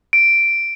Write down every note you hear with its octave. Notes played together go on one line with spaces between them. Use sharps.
D7